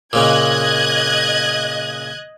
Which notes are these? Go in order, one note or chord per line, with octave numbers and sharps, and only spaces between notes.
A#2 C#3 A#3 D#5 F#6 G#6